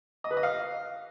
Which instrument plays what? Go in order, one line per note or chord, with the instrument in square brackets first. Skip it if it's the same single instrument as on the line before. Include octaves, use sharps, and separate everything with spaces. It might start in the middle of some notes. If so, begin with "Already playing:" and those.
[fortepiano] D#5
B4
D#5
F5